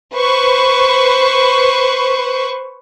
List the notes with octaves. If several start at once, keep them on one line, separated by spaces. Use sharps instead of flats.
B4 C5 C#6